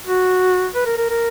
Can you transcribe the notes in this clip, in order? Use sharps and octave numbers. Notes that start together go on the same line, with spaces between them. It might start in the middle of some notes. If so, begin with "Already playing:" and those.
F#4
B4
A#4
A#4
A#4